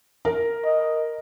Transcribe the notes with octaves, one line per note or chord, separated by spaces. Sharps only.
A#4
D#5